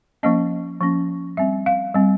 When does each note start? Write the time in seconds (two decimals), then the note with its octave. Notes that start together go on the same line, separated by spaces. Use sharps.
0.23 F3 A#3 C#4 D#5
0.81 F3 A#3 C#4
1.37 G3 C4 E5
1.66 F5
1.95 G3 C4